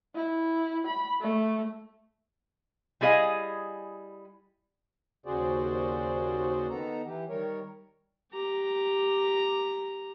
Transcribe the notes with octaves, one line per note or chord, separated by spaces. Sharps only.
E4
B5
A3
G3 E4 G#4 D#5 F5
D#2 C#3 F#4 G#4 C5 D5
D#3 B3 A4 A#5
E3 G4
D#3 G3 A#4 C#5
G4 A#5